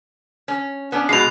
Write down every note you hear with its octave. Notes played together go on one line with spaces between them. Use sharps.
C#4
B3 C#4 D4
B2 G#3 C7 F7